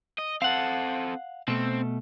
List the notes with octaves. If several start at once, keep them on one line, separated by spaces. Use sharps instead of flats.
D#5
C4 A4 F5 F#5
B2 A3 C4